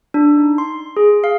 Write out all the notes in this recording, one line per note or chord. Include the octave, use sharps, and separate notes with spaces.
D4
D#4
C6
G#4
F5